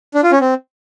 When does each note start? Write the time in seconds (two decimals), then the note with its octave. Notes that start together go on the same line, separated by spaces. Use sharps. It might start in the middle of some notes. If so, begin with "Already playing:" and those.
0.14 D4
0.23 F4
0.32 C#4
0.40 C4